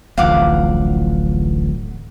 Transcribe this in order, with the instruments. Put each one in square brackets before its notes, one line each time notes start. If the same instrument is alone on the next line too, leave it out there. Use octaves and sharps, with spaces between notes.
[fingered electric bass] D1 A1 F3 [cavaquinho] F5 F#5 D6